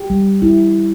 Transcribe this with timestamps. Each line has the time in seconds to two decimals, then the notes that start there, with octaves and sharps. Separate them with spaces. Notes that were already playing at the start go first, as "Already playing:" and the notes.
Already playing: G4
0.10 G3
0.42 E4